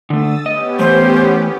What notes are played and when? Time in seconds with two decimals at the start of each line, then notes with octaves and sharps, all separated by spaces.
0.10 D3 A3 D#6 E6 A6
0.46 B3 C#4 G4 D#5
0.79 E3 A3 C5